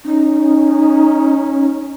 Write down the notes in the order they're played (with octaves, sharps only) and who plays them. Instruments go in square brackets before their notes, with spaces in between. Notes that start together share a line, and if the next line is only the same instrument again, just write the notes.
[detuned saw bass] C#4 [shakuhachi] D#4